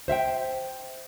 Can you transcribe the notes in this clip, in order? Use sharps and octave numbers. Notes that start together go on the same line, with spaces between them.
C5 E5 F5 G5